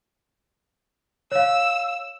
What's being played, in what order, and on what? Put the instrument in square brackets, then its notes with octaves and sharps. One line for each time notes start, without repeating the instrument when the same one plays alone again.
[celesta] C#5 F5 [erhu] E6